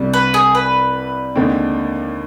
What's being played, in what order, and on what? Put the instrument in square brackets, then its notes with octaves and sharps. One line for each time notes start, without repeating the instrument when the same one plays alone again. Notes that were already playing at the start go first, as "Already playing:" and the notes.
Already playing: [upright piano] C2 C3 G3 D4
[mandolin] B4
G#4
B4
[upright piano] D#2 D3 G#3 C4